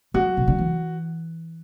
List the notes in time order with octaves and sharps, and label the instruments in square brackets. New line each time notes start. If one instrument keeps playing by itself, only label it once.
[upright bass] F#3 [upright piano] F#4
[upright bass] B2
D3
E3